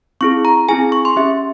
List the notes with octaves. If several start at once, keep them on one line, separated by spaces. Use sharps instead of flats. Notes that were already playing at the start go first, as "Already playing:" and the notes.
C4 E4 G#4 C#6
A#5
C4 E4 G#4 G#5
C#6
C6
C#4 G4 E5